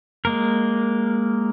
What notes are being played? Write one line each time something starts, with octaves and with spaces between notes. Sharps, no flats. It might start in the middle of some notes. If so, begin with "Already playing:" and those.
G#3 A#3 A#4